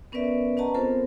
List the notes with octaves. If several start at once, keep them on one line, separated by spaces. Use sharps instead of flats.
B3 C#4 A#4 B4 D5 E5
C#4 B4 D#5 F#5 A5 A#5
B3 C4 F4 A4 A#4 C5